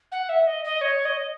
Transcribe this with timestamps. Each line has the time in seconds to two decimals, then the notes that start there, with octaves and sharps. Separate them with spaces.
0.11 F#5
0.29 E5
0.47 D#5
0.64 D#5
0.81 C#5
1.05 D#5